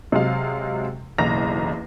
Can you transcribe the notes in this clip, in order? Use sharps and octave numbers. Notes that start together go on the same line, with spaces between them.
C3 F#3 G#3 D#5 F5
F#1 B1 E2 A#5 A#6 F7